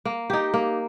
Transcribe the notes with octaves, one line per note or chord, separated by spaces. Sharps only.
A#3
D#4 G4
A#3